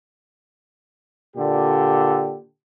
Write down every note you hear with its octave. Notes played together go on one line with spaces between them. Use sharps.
A#2 D3 G4